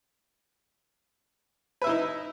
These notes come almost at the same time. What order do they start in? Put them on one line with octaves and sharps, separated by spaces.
B4 E5 E4 D#4